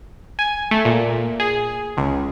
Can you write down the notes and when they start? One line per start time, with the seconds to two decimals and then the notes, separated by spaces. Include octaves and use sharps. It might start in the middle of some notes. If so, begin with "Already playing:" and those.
0.39 G#5
0.71 A3
0.85 A#2
1.40 G#4
1.97 C#2